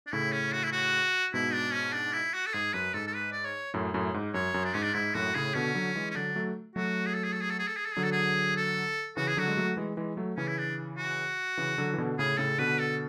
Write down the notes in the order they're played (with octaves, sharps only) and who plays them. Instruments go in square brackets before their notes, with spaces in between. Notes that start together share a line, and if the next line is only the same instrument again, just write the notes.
[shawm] D4
[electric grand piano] A2 C#3 [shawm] E4
[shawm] C#4
F#4
E4
F#4
[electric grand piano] G#2 B2 [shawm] E4
[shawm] D4
C#4
D4
E4
F#4
A4
[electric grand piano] G#2 [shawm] G#4
[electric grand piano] F#2 [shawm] B4
[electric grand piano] G#2 [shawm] A4
[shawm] A4
B4
D5
C#5
[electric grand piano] F#2 A2
F#2 A2
G#2
[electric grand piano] F#2 [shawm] C#5
[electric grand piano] F#2
[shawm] D4
[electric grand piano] G#2 [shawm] C#4
[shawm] D4
[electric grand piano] G#2 [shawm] E4
[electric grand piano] F#2 A2 [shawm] F#4
[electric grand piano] A2 C#3 [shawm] G#4
[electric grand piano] B2 D3 [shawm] C#4
[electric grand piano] D3 F#3
E3 G#3
[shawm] C#4
[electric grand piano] D3 F#3 [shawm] D4
[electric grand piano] F#3 A3
[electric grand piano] F#3 A3 [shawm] F#4
[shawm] G#4
A4
G#4
A4
G#4
A4
G#4
A4
G#4
A4
[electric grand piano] D3 F#3 [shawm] G#4
[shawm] A4
G#4
A4
[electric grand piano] C#3 E3 [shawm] F#4
[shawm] G#4
[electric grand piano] D3 F#3 [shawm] F#4
[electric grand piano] G#3
F#3 A3
E3 G#3
E3 G#3
F#3 A3
[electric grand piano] C#3 E3 [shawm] C#4
[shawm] E4
D4
F#4
[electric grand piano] C#3 E3
D3 F#3
E3
B2 D3
[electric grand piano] A2 C#3 [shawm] G#4
[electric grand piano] A2 C#3 [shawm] A4
[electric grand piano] B2 D3 [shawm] B4
[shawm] A4